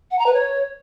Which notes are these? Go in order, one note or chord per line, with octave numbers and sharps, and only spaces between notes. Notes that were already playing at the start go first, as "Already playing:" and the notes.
F#5
A#5
B4
C#5